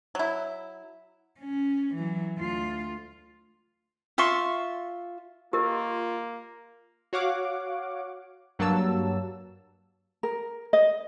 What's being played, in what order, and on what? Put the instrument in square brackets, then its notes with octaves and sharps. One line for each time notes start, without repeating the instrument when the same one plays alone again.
[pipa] F#3 E4
[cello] C#4
E3 F#3
D2 F4
[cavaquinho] F4 E5 C6 C#6
[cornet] A#3 [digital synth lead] F4 [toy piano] G4 A#4 D#5
[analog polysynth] F#4 C#5 F5 F#5 D6
G2 F#3 A#3 A5 E6
[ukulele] A#4
D#5